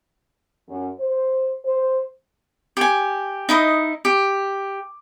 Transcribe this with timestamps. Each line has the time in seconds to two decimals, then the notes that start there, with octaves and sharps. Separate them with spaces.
0.69 F#2
1.00 C5
1.65 C5
2.77 G4 G#5
3.49 D#4 E4 D#5
4.05 G4